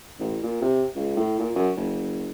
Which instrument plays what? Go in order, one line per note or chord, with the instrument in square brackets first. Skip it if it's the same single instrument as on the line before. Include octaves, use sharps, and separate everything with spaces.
[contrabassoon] A1
A#2
C3
C#2
A2
A#2
F#2
F#1